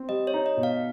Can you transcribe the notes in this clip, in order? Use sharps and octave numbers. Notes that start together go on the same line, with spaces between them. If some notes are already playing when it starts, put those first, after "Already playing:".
Already playing: C4
G3 D#5
C#5
D#4
D#5
B2
F5